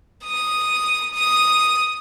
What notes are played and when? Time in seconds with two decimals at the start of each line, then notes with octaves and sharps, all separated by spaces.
0.25 D#6
1.14 D#6